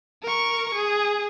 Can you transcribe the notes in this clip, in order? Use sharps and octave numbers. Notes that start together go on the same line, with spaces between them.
A#4 C#6
G#4